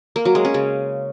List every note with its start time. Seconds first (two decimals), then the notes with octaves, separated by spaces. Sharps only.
0.16 A#3
0.25 F#3
0.35 G#3
0.45 C#4
0.54 C#3